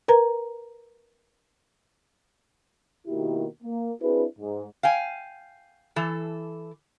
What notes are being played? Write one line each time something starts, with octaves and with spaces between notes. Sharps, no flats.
A#4 B4 A#5
B2 D#3 A#3 E4 F#4 G4
A#3
C4 D4 E4 F#4 G#4 B4
G#2
F5 G5 G#5
E3 A4